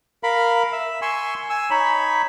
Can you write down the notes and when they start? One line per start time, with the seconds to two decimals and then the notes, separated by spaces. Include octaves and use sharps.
0.23 A#4 F5 B5
0.72 E5
1.02 G#5 C6 C#6 E6
1.50 G#5 E6
1.70 D#4 C#5 B5